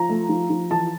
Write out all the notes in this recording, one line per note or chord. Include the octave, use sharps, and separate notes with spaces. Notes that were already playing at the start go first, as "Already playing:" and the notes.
Already playing: F3 A#5
A3
F3
F3
E3 A5